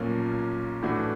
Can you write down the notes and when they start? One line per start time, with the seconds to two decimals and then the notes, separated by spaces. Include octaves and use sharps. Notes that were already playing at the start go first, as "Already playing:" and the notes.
Already playing: B1 A#2 F3 A#3 C#4
0.82 A2 E3 A3 D4 F#4